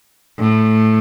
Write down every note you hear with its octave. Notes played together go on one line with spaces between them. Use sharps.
A2